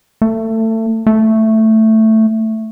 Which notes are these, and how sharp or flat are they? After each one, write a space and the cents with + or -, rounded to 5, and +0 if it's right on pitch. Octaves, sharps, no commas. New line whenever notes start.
A3 +25
A3 +5